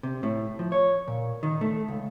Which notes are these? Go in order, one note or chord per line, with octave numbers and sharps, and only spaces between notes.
C3
A2
F3
C#5
A#2
D#3
A3
C#2